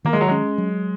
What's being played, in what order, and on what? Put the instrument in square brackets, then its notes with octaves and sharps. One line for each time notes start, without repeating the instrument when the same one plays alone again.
[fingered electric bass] D#3 [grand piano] A#3
[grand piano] G#3
F#3
[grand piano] G#3 [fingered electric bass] C#4
[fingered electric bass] F#3